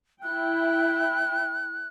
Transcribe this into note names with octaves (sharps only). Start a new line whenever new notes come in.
E4 G5 F#6